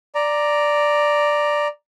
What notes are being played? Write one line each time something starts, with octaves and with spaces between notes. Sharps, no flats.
D5 A#5